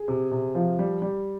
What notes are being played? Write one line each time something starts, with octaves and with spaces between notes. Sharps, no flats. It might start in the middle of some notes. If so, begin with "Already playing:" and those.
Already playing: G#4
C3
C3
F3
G3
G3